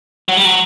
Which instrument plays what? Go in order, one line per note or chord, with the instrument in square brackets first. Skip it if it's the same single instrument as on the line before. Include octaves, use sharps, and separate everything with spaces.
[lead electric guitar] F#3
G3
F#3